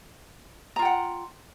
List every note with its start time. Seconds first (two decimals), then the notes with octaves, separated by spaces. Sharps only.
0.76 A#5
0.79 F4
0.82 G5
0.85 F#5